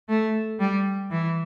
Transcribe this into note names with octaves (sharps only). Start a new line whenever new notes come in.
A3
G3
E3